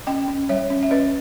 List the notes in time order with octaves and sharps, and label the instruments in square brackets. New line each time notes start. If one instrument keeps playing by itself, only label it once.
[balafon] C#4 D#5 G5
C#4
G3 C#5 E5
C#4
E5
C#4 B4 D#5